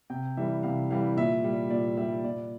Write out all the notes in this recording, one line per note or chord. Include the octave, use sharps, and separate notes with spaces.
C3 G5
E3 G3 E5
C3 F5
E3 G3 F5
A#2 E5
G3
A#2 D5
G3 E5
A#2 D5